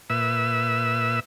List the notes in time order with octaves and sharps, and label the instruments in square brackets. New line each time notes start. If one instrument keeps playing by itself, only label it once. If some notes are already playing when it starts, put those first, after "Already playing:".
[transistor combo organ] A#2 B4 E5 E6